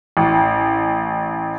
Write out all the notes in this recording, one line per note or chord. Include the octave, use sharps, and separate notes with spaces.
A1